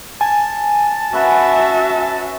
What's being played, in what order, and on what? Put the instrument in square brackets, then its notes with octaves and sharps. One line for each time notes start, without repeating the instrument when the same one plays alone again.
[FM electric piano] G#5 [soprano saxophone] A5
[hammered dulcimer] C#4 B4 F#5 [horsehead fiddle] F#4 E5